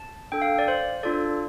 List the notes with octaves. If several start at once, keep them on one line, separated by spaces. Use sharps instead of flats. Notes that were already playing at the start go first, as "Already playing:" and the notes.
Already playing: A5
D4 A4 G5
F5
D5
C5
D4 F4 A4 D5